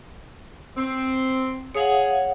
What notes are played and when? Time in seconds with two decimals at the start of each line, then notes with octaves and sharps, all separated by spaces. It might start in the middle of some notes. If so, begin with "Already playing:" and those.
0.76 C4
1.75 G#4 C#5 F5 F#5